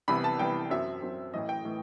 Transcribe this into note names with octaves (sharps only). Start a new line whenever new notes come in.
C2 C3 E3 B3 B5
A5
C2 C3 E3 B3 G5
F#2 F#3 C4 E5
F#2 F#3 C4
A1 A2 E3 D#5
G5
A2 E3